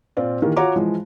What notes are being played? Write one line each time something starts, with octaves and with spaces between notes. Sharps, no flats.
A#2 C4 F4 D5
D#3 E3 A#3 G4
F4 F#4 C#5 F#5 A#5 D6
E3 F3 G#3